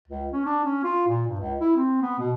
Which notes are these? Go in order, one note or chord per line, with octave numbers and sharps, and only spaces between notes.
C#2
C#4
D4
C#4
F4
A#2
G2
C#2
E4
C4
B3
B2